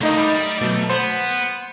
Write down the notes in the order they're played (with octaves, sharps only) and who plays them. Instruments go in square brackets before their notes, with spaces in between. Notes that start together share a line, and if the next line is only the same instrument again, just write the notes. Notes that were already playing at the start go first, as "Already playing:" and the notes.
[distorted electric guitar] D3 A#3 [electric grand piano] A3 D#4 D#5
[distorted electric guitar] D5 B5
[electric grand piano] A6
[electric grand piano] B2 F#3 [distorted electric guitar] A3
[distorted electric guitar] B3 [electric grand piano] C5